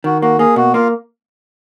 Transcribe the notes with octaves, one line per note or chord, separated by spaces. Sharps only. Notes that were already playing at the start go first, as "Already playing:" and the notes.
D#3 F#4
A#3 F#4
A#3 G#4
B2 F#4
A#3 F4